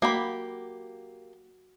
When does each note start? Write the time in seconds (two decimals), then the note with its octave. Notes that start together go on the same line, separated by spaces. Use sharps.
0.02 A#3 F#4 G4 B5